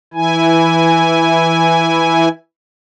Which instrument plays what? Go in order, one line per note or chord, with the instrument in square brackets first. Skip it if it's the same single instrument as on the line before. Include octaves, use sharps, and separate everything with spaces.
[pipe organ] E3 E4 G#5